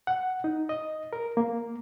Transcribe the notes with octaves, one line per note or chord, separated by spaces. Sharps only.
F#5
D#4
D#5
A#4
A#3